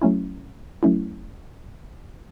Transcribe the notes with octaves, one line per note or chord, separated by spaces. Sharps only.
F#3 A3 C#4 E4
F#3 A3 C#4 E4